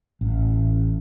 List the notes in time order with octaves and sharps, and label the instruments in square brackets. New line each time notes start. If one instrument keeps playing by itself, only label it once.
[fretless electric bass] A1